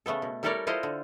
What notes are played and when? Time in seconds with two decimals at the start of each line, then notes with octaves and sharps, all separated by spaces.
0.06 C#3 A3 B3 A4
0.22 B2
0.43 G3 E4 A4 A#4 C#5 D5
0.67 E4 F4 A4 C5 D#5
0.83 D3